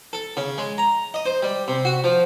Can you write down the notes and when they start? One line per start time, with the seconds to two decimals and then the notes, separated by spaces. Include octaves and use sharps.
0.13 A4
0.37 C#3
0.58 G#3
0.78 A#5
1.14 D#5
1.26 C5
1.43 G3
1.68 C3
1.85 F#4
2.04 F3